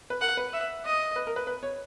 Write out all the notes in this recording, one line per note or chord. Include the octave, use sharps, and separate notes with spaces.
B4
A#4 F#5
B4
E5
D#5
B4
A#4
B4
B4
C#5